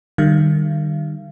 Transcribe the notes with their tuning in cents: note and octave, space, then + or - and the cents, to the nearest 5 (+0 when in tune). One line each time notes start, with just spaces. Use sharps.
D#3 -35 G3 +0 F5 -35